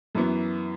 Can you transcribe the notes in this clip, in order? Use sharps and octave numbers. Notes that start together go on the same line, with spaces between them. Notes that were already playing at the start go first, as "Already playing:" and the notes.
F#2 E3 B3